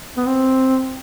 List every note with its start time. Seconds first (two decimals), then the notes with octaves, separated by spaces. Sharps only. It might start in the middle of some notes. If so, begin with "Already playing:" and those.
0.17 B3
0.26 C4